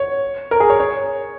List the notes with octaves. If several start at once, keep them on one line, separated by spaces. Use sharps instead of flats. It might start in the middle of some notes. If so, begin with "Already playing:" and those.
Already playing: C#5
A#4
G#4
C#5
C#5